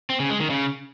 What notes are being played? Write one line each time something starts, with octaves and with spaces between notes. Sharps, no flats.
C4
C#3
G#3
D#3
C#3